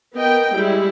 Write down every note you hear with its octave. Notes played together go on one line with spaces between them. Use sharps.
B3 A#4 D#5 G5
G3 G#3 E4